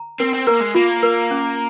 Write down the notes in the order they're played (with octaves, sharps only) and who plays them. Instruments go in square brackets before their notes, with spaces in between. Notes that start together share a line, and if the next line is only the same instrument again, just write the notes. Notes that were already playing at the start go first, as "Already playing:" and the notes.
Already playing: [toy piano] A#5
[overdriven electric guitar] C4 [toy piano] A#4
[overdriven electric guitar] C4
[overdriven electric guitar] A#3 [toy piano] A#4
[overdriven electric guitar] G#3
[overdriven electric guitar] A#3 [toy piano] F4
[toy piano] A#4
C#4